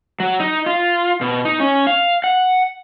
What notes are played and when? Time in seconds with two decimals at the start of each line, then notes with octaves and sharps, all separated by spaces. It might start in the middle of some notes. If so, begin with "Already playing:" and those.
0.20 F#3
0.40 D#4
0.66 F4
1.21 B2
1.45 D#4
1.60 C#4
1.87 F5
2.24 F#5